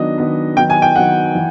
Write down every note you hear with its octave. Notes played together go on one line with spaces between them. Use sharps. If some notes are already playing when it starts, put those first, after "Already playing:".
Already playing: D#3 F#3 B3 D4 D#5
D#3 F#3 B3 D4
D#3 F#3 B3 G5
G#5
G5
D#3 F#3 B3 F#5
E3